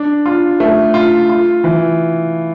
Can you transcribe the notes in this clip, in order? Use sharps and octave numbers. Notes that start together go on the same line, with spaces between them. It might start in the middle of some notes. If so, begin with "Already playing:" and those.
Already playing: D4
F4
A3
F4
F4
E3